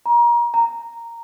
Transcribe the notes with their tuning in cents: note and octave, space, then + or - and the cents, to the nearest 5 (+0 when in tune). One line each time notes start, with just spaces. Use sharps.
A#5 +30
A#5 -5